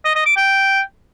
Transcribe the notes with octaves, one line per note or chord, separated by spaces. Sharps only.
D#5
D#5
D6
G5